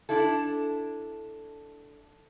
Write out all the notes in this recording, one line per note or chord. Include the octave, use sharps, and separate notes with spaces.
D4 E4 A4